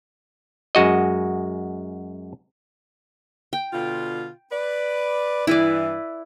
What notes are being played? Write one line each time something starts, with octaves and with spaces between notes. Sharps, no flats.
F#2 G#3 F#4 D#5
G5
B2 D3 F4
B4 D5
G2 E3 E4 B4 D5